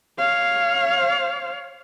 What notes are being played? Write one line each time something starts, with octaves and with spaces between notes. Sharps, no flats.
C#5 F5